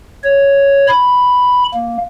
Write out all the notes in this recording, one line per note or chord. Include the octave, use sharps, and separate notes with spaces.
C#5
B5
A#3